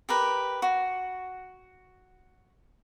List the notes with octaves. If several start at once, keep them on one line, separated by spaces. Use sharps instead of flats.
G4 A#4 B4
F#4